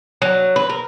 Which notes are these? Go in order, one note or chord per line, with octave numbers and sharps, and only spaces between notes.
F#3
B4
A#4